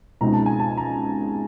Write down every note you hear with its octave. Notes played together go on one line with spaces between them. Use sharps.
C#2 B2 G#3 C4 D#4 A#5
A5
G#5
A5
A#5